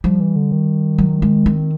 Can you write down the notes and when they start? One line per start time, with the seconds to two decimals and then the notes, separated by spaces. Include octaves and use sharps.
0.04 F3 G3
0.20 E3
0.36 D3
0.52 D#3
0.98 F#3
1.22 G#3
1.46 C4